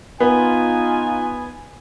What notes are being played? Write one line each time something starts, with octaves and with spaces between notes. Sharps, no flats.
B3 D#4 F4 G#5